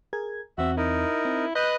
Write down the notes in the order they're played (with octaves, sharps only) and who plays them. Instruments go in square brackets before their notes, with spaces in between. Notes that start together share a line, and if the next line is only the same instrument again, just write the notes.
[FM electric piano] G#4 A#4 G#6
[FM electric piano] E2 C4 [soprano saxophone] F#4 [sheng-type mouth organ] E5
[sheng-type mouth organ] D#4 A#4 [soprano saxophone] E4
[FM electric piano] C4
[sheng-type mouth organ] B4 D#6 F#6 [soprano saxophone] D#5 [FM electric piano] B5 G6